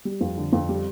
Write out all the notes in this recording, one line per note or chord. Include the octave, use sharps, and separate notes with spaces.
G3
F2
D3
F2
G3